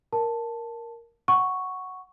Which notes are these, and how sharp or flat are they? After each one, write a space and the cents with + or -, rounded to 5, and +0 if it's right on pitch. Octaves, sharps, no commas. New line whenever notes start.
A#4 +0 A5 +0
F#5 +0 C#6 +0